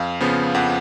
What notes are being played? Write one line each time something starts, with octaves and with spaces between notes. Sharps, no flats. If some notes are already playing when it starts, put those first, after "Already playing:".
Already playing: F2 F5
C#3 F3 B3
F2 F#5